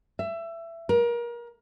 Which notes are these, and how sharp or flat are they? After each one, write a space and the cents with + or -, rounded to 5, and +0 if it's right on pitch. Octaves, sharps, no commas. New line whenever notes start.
E5 +20
A#4 +30